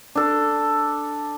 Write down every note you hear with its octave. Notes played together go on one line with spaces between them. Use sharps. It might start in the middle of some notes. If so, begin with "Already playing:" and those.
D4 A4